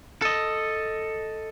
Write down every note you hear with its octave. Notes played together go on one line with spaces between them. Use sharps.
A4 D#5